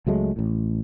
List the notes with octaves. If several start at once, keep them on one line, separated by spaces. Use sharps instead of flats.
C#2 F#3 G#3 A3
A1 A2